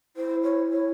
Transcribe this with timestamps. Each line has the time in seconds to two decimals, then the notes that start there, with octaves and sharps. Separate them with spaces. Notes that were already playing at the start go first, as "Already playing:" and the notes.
0.16 E4 C5
0.43 C#5
0.70 C#5